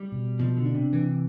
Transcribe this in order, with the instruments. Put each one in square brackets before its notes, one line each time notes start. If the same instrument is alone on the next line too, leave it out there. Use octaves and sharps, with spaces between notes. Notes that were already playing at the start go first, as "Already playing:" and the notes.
Already playing: [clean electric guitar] G3
[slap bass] B2
[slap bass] B2 [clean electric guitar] F3
[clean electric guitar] D3
[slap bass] D4
[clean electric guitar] C3
[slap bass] E3